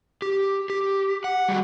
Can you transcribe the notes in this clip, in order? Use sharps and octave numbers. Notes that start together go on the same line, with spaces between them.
G4
G4
F#5
G3 G#3 F#4